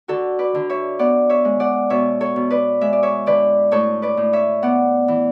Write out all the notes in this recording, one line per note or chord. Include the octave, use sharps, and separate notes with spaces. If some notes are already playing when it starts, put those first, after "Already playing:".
D3 F#4 A4
B4 D5
D3
C#5 E5
B3 D5 F#5
C#5 E5
G#3
D5 F#5
B2 C#5 E5
A4 C#5
B2
B4 D5
G#3 E5
D5
C#5 E5
D3 B4 D5
A2 A4 C#5
B4 D5
A2
C#5 E5
B3 D5 F#5
E3